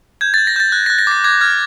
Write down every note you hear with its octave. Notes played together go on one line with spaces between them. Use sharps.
G6 G#6
G6 A6
A#6
G6 A6
F#6
A#6
F#6
A#6
D6 A6
D6 G#6
F6 G#6